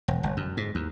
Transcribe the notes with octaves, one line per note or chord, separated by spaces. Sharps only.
E1
G1
F#2
G#2
D#2